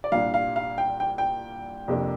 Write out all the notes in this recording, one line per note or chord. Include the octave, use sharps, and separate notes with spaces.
D5
C2 A#2 G3 D4 F5
F5
F5
G5
G5
G5
F2 C3 A#3 D4